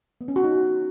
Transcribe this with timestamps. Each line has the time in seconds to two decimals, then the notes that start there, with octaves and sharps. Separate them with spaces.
0.21 B3
0.28 C#4
0.36 F#4
0.44 D#4